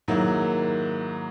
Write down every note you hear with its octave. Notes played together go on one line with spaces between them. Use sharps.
G#2 D#3 F#3 A#3 E4